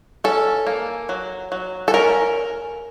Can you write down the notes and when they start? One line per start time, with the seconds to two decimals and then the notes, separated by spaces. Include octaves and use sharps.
0.24 C#4 A4
0.67 A#3
1.09 F#3
1.52 F#3
1.88 A4
1.94 C#4 A#4